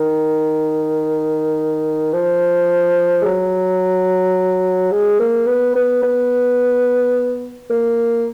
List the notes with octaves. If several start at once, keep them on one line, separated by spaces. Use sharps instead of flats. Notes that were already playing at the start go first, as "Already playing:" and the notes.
Already playing: D#3
F3
G#3
F#3
G#3
A#3
B3
B3
B3
A#3